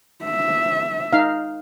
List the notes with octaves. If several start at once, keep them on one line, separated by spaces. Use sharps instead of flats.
E5
D#4 F5